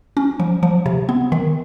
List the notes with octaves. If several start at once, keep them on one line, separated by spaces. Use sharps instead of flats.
C#4
F3
F3
C3
B3
D#3